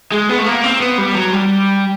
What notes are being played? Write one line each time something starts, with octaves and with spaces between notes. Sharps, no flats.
G#3
B3
A3
A#3
C4
B3
G3
F#3
G3